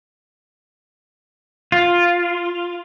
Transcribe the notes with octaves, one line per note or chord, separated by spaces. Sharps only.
F4